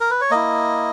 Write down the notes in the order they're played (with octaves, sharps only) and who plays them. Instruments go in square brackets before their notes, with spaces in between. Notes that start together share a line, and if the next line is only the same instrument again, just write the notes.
[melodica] A#4
B4
C#5
A#3 E4 D#5